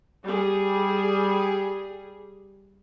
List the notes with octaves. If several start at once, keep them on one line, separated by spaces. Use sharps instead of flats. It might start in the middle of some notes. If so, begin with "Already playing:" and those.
G3 G#4